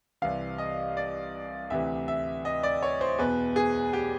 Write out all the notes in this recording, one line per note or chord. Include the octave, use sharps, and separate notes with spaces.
C2 C3 E3 F5
D#5
D5
D2 C3 E3 E5
E5
D#5
D5
C#5
C5
E2 B2 B4
G#4
G4